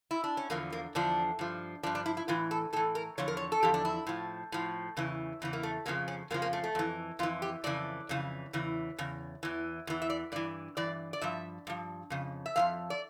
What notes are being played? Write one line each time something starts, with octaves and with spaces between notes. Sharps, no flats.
E4
D4
C#4
E2 D3 F3 A#3
A#3
E2 D3 F3 D4
G2 F3
G2 F3 D4
D4
E4
E4
A2 E3 F4
A4
A2 E3 A4
A#4
E2 D3 F3 C#5
A#4
C#5
A4
E2 D3 F3 G4
D4
E4
A2 F3
A2 F3
E2 C#3 E3
E2 C#3 E3
A#3
A3
F2 C#3 F3 A#3
C#4
F2 C#3 F3 A#3
A#3
A3
A3
F2 E3
F2 E3 F4
G4
F2 C#3 E3 D5
F2 C#3 E3
E2 C#3 E3
E2 C#3
E2 E3
E2 E3
E5
D5
G2 E3 D5
G2 E3 D5
D5
G2 F3 E5
G2 F3
F2 C#3
E5
F2 C#3 F3 F5
D5